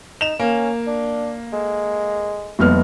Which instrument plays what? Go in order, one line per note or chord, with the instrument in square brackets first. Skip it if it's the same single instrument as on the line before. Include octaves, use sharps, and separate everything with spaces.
[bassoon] D#4 [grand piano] E7 F7
[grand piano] A#3 [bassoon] C#4
[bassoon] D4
[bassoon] G#3 [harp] A4
[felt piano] F1 B3 F6 [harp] F#3 G3 A#3